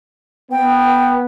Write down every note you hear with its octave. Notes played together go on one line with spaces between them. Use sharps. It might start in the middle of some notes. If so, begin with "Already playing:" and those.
B3 G5